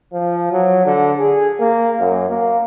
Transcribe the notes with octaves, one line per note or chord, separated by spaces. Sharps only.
F3
F#3
D3
G#4
A#3
F#2
A#3